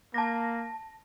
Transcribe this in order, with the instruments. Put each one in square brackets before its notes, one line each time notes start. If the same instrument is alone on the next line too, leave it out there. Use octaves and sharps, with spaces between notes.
[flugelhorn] A#3 [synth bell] A5 A#6